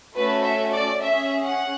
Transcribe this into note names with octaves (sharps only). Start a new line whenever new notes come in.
A3 C#4 F#4 A4 B4
E5
D5
C#4 G#4 E5
F#5